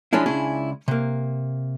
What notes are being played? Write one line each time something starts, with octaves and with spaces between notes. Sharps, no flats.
F3 G#3 C#4 D4 E4
C#2 C#4 D4 E4 G#4
C3 A#3